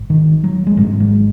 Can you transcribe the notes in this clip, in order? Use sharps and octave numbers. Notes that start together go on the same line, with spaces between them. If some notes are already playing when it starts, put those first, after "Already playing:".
Already playing: G#1 G#2
D#3
F#3
G#3
G#1 G#2 F#3
G#3